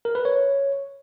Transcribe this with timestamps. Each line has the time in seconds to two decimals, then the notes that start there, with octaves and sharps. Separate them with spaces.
0.05 A#4
0.15 B4
0.25 C#5